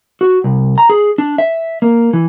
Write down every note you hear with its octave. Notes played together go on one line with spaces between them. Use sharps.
F#4
C2
A#5
G#4
D4
E5
A#3
E3